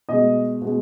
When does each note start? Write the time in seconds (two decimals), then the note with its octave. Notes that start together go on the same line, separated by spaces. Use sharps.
0.09 B2 G#3 D#5
0.62 B2 G#3